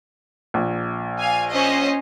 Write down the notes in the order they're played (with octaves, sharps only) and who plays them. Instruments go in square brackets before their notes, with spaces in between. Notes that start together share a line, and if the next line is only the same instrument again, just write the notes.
[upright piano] A#1
[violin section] F5 G#5
C#4 C5 D#5